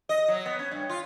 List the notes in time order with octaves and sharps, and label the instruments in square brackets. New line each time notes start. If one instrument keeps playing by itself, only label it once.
[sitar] D#5
F#3
B3
C#4
G2
F4